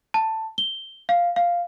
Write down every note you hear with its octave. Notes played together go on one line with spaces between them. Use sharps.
A5
G7
F5
F5